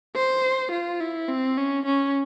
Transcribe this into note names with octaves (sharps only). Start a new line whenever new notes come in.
C5
F4
E4
C4
C#4
C#4